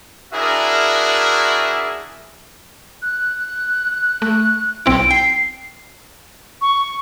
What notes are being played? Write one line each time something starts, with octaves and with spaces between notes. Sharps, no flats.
D4 E4 F#4 G#4 A#4 E5
F#6
A3 F#6
B1 C4 E4 D7
G5 C7
C#6